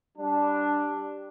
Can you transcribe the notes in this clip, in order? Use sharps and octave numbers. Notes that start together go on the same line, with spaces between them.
G3 D4